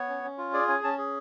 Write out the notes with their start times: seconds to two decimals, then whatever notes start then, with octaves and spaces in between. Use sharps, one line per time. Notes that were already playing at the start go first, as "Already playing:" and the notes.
Already playing: B3 C#5
0.09 C#4
0.24 C#4
0.38 F4
0.53 G#4 D5
0.68 C#4 G#5
0.84 C#4 A5
0.98 G#4